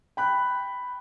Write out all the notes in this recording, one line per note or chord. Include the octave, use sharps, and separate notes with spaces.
G5 B5 F#6